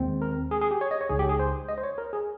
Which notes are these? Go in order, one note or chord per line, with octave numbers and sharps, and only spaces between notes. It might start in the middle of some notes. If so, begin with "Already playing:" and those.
Already playing: D#2 D#3 G#3 C4
A#4
G#4
G#4
G4
C#5
D#5
C#5
C#2 C#3 G#3 D#4 G#4
G4
G#4
C5
D#5
C5
C#5
A#4
G#4